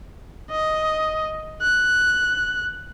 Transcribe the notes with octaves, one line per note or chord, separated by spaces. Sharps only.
D#5
F#6